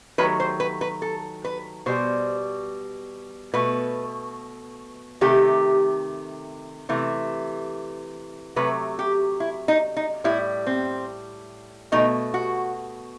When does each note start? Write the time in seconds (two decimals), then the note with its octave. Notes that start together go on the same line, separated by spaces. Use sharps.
0.18 D#3 F#3 A3 B4
0.40 C5
0.60 B4
0.81 B4
1.02 A4
1.45 B4
1.86 B2 G3 C5
3.54 B2 A3 B4
5.21 C3 D#3 A3 G4
6.89 C3 E3 A3
8.56 C3 F#3 A3 B4
8.99 G4
9.40 E4
9.68 D#4
9.97 D#4
10.24 A2 G3 E4
10.67 C4
11.92 B2 A3 D#4
12.34 F#4